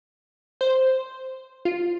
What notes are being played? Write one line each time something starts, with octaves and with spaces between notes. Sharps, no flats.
C5
F4